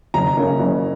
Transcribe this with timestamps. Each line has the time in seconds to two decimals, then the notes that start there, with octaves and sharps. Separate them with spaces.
0.14 F#1 A#5
0.37 F#2 C#3 A#3 C#4
0.59 F#1